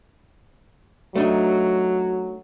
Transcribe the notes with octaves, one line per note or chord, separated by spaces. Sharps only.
F#3 A3 D4 D#4